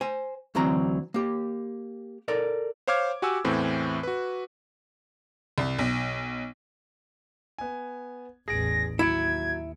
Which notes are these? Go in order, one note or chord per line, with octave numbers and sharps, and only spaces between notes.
C5 G#5
D2 E3 F#3 C4 A#5
A#3 G4
A4 A#4 D5
C5 C#5 F5 D6 F6 G#6
F#4 G4 F#5 G#5 D6 E6
E2 A2 E3 C4
F#4 B4
C2
B1
B3 G#5
A1 E2 G#4 A#6 D7
D#2 F#3 E4 G#6 C#7 D7